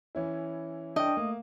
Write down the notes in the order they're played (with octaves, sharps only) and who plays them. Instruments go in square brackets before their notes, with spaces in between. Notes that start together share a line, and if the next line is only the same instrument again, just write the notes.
[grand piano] E3 C#4 E4
[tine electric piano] D4 G5 [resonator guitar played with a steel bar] D#5
[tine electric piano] A3 [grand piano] A#3